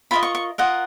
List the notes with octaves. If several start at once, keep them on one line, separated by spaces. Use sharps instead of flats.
F4 A#4 D#5 B5
C#6
C#6
F4 A#4 D#5 F#5